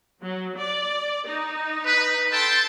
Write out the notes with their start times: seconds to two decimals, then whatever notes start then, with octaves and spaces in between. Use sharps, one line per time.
0.21 F#3
0.57 D5
1.27 D#4
1.85 B4
2.32 A4 G5 A5 C6 G6 A6